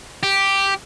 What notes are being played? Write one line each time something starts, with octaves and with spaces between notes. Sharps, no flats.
G4